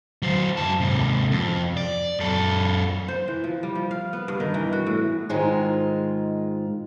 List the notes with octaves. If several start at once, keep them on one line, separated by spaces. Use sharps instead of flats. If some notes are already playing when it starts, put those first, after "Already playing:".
F#3 C5
F#2 A5
G#2 C3
F2
D5
F#2 A4
C5
E3
F3
G3
F3
F5
B3
G2
D#3
E3
F#4
A2
G#2 D#3 G#3 F4